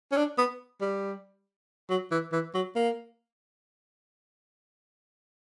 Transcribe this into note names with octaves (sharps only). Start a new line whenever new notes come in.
C#4
D4
B3
G3
F#3
E3
E3
F#3
A#3